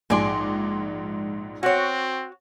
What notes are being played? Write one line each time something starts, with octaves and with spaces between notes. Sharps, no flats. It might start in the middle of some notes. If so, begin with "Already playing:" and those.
A#1 G#2 G#4 D5 C6
C4 F#4 C#5